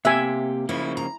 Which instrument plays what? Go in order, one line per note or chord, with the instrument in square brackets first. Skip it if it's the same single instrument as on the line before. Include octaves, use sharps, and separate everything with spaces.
[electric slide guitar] C3 B4 G5 [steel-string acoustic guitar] A#3 G4 [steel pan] E5 G#5
[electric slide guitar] C#3 F3 A#3 [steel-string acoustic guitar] E4
[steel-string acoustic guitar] A#5